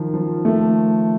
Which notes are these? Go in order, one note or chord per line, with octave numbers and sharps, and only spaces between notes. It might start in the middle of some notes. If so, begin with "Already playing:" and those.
Already playing: D#3 F3
F3
A3